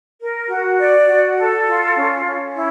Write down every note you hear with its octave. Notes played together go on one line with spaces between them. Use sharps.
A#4
F#4
D5
F#4
A4
F4
C#4
C#4
E4